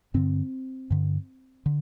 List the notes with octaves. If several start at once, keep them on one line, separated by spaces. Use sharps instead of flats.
G2 D3 C4
G2 D3
D3